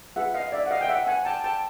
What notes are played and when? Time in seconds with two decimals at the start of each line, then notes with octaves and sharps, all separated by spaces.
0.16 F4 G#4 B4 E5 F#5
0.34 D#5 F5
0.52 D5 E5
0.66 F#5
0.71 D#5 F5
0.81 G5
0.89 E5 F#5
1.07 F#5 G#5
1.25 G5 A5
1.44 G5 A5